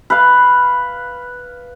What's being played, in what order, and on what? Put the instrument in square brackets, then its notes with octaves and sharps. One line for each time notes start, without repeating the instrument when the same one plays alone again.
[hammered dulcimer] B4 F5